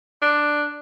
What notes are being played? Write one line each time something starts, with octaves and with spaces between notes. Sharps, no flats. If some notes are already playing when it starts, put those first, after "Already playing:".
D4